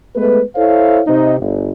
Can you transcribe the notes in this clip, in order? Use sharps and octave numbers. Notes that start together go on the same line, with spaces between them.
G#3 A3 B3 B4
E4 A4 C5 C#5 F5
C3 C4 D#4
G1